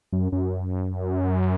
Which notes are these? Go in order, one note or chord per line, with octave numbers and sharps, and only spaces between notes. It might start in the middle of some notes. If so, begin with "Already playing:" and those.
F#2
F#2